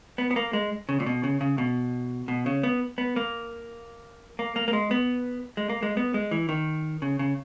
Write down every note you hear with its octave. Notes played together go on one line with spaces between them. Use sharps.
B3
B3
A#3
G#3
C#3
A#2
B2
C#3
C#3
B2
B2
C#3
B3
B3
A#3
A#3
A#3
A#3
G#3
B3
G#3
A#3
G#3
B3
G#3
E3
D#3
C#3
C#3